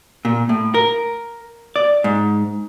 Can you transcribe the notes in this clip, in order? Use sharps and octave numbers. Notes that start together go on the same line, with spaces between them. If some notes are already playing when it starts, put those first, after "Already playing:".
A#2
A2
A#4
D5
G#2